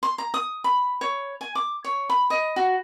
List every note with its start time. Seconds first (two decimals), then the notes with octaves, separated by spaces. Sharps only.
0.03 C6
0.18 A#5
0.34 D#6
0.64 B5
1.01 C#5
1.41 G#5
1.55 D6
1.84 C#5
2.10 B5
2.30 D#5
2.56 F#4